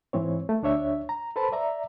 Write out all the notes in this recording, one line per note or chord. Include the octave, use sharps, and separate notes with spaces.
G#2 E3 C4 C#5
A3
D2 D4 C#5 E5
A#5
A4 B4 C5 A5 B5
D5 E5 A#5